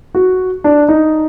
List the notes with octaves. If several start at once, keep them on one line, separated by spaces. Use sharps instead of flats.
F#4
D4
D#4